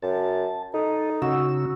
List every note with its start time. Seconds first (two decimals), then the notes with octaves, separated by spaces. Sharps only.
0.02 F#2 A5
0.74 D#4 A4 D#5
1.22 C#3 C#4 F#4 E6